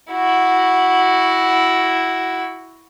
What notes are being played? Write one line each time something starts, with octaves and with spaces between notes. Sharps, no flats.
E4 F#4